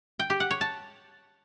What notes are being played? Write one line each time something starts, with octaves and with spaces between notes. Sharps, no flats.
G5
G4
F#5
C#5
A5